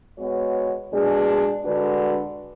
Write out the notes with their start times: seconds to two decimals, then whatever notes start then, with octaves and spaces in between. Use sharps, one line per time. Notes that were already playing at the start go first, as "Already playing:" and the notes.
0.18 G#3 B3 F#4 C#5
0.91 B2 G#3 D4 G#4
1.64 D3 G#3 D4 F#4 B4